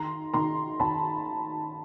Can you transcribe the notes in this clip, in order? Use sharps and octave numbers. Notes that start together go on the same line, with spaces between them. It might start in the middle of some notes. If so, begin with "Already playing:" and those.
Already playing: D#3 A#5 C6
D#3 A#5 C6
D#3 A5 B5